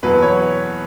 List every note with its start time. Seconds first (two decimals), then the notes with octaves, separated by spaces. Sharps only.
0.03 E2 B2 F#3 B4
0.22 C#5